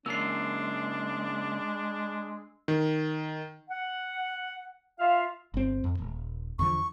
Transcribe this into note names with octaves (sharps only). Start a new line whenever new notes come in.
C#3 G#3 A#3 D4 E6 C7
D#3
F#5
F4 E5 F5
G1 C4
F2
D#1
E2 D3 F3 C#6